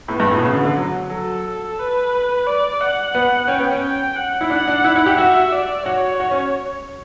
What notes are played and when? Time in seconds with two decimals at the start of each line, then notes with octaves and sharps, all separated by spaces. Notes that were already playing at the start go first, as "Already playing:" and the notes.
0.08 A2 B3
0.20 G2
0.31 A2
0.37 B2
0.43 C#3
0.53 D3
0.65 D3
0.76 F#3
1.10 F#3 A4
1.79 B4
2.47 D5
2.80 F#5
3.15 B3
3.48 C#4 G5
3.59 B3
3.71 C#4
3.82 G5
4.16 F#5
4.41 E4
4.50 D4 F#5
4.68 D4
4.84 E4
4.96 E4
5.06 G4
5.18 F#4 E5
5.52 D5
5.86 F#4 C#5
6.20 F#4
6.31 C#4